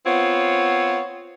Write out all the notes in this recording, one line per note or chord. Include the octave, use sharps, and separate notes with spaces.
B3 C4 F4 C#5